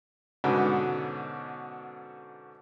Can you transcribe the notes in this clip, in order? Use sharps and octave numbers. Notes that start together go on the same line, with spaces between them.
G#2 B2 D3 B3 C#4